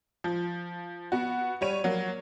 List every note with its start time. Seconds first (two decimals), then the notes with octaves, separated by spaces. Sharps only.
0.24 F3
1.12 B3 F#4
1.61 G3 C#5 D#7
1.84 F#3 A#3